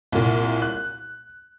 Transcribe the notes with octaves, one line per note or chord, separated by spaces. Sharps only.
C2 A#2
F#6